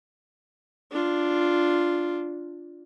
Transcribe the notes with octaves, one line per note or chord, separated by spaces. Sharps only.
D4 F4